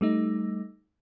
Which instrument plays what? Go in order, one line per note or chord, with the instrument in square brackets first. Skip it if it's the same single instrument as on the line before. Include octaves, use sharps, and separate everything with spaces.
[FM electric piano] G3 A3 D#4